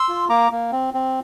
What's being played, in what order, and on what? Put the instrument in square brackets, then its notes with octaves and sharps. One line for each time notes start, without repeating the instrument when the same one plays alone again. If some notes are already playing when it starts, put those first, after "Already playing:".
Already playing: [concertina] C6 E6
F4
A#3 A#5 D6
A#3
C4
C4